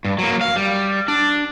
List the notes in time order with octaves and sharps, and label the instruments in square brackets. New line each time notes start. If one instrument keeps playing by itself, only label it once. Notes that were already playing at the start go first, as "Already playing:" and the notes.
[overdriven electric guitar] G2
F#3 A#3
F5
G3
D4